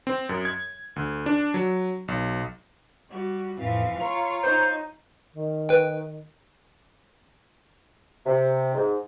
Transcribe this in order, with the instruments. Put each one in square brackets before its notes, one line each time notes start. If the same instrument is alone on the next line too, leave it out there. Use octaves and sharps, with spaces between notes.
[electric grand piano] C4
F#2
G#6
D2
D4
F#3
B1
[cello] G3 [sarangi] F#4
[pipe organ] F2 A2 [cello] E3 F3 [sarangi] F5
[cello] F4 C#5 [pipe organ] A#5
[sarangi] D#4 [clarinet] C5
[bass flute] D#3
[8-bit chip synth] B4 G5
[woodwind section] C3
G#2